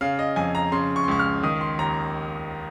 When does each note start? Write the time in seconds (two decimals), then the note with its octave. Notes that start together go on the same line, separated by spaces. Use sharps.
0.01 C#3 F5
0.19 D#5
0.36 F2 G#5
0.55 A#5
0.72 C#3 C6
0.96 C#6
1.04 C6
1.08 C#2 C#6
1.19 F6
1.43 D#3 D#6
1.61 C6
1.79 D#2 A#5